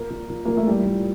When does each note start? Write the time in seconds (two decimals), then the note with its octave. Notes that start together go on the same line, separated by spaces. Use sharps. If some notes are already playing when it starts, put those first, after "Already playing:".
Already playing: A#2 A#3
0.10 A#2
0.30 A#2
0.45 A#2 A#3
0.57 A3
0.67 A2 G3
0.86 A2